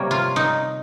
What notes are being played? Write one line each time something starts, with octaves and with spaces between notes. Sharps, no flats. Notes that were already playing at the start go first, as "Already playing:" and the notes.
Already playing: C3 G3 A#3 C#5
F4
D#4